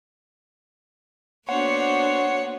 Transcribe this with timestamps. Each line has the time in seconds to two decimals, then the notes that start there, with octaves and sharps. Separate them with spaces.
1.49 A#3 B3 D4 F#4 C5 C#5 F#5